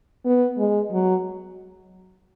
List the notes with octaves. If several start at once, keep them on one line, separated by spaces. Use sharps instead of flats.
B3
G#3
F#3